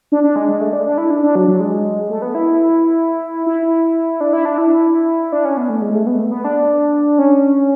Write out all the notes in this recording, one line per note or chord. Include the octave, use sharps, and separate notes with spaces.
D4
D4
G#3
G#3
A3
D4
D4
E4
D4
D4
F#3
F#3
G#3
A3
B3
E4
E4
D4
E4
D4
E4
D4
C#4
B3
A3
G#3
A3
B3
A3
B3
D4
C#4